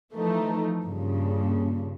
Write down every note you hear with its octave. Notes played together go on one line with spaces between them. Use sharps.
E3 F3 A3 D#4
G2 A#2 C#3